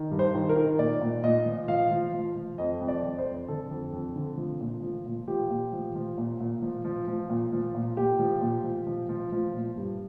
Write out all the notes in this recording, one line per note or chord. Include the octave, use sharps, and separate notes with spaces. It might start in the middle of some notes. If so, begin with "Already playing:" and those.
Already playing: D#3
G2
C5
D#3
A#4
D#3
A#2 D5
A#2
A#2 D#5
F3
F3 F5
F3
F3
F3
F2 D#5
F2
D5
F2
C5
F2
D3 A4
F2
F2
D3
F3
A#2
F3
A#2
F3 G4
A#2
F3
F3
A#2
A#2
F3
F3
F3
A#2
F3
A#2
A#2 G4
F3
A#2
F3
F3
F3
F3
A#2
G2